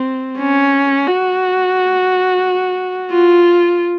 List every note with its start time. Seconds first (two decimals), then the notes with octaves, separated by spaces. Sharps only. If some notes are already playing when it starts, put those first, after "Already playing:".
Already playing: C4
0.39 C#4
1.07 F#4
3.11 F4